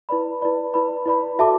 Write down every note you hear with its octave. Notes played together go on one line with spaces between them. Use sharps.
E4 B4 D5 B5
E4 B4 D5 B5
E4 B4 D5 B5
E4 B4 D5 B5
F#4 A4 E5 A5 D6